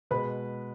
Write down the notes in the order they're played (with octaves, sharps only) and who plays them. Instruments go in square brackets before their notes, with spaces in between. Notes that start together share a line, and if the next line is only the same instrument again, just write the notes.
[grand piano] B2 G#3 B4 B5